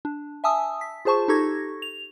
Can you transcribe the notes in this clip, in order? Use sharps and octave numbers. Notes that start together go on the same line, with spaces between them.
D4
E5 G#5 A5 D#6 E6
B6
F4 G#4 C5 A5 C#6
D#4 G4 A4 C#6 G#6 A#6
F7